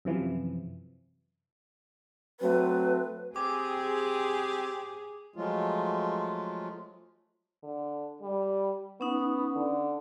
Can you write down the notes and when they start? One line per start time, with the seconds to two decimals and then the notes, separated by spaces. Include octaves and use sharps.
0.05 F#2 C3 E3 F3
2.40 F#3 A3 C4 B4
3.36 C4 G4 G#4 G#5 D6
5.36 F3 F#3 G#3 A3 F4
7.63 D3
8.22 G3
9.01 B3 C#4 D#4
9.56 D3